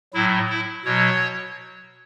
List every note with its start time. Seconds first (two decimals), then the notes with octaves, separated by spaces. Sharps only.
0.14 A2 F#3 E4
0.49 E4
0.85 B2 F#3 C#5